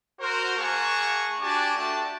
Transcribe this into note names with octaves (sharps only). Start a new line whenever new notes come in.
F#4 A#4 C5
A#3 G#4 F#5 A5 C#6
D4 F#4 G4 G#5 A5 D6
A3 D4 F#4 D5 G5 A5